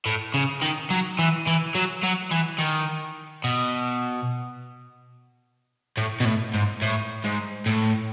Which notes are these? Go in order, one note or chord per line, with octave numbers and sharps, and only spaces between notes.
A2
C#3
D#3
F#3
E3
E3
F#3
F#3
E3
D#3
B2
A2
B2
A2
G#2
A2
G#2
A2